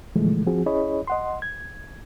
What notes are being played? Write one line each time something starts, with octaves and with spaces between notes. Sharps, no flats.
A#2 D3 E3 F3 G#3 A3
F3 C4 F#4 G#4
C#4 E4 G#4 C#5 D#5 B5
D#5 F#5 C6
G#6